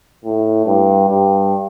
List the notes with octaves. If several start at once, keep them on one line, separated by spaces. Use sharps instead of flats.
A2
G2
G2